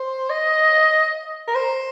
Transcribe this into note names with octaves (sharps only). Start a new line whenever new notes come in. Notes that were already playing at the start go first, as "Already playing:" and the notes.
Already playing: C5
D#5
A#4
C5